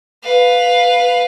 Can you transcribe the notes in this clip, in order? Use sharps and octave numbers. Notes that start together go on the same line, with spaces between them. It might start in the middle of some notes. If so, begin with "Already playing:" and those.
B4 F5